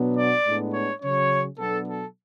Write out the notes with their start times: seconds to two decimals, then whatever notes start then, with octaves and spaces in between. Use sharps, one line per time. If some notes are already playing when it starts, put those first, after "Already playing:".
Already playing: B2 F#3 B3 D4
0.18 D5
0.45 A2 G#3 B3 D4
0.74 C#5
1.02 C#3 F#3 C#4 C#5
1.58 B2 F#3 B3 D4 A4
1.87 A4